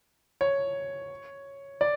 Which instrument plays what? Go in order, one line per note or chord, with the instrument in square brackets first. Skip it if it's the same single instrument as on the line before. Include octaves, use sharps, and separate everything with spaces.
[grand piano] C#5
D5